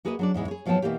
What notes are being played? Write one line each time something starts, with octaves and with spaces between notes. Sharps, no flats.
A#3 F#4 G#4 B4 D5 D#5
F#3 D4 D5
E2 G#2 G#3 E4
G#4 C#5
G#2 F3 F#3 B3 G5 A5
B2 D#3 E3 A#3 G4